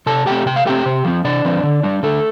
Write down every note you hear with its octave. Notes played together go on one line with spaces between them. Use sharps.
C3 A4 A5
A3 C4 G4 G5
C3 G5
F5
A3 C4 G4 G5
C3
F3 C4
C3 D4 D5
F3 C4
D3
G3 D4
D3 A3 A4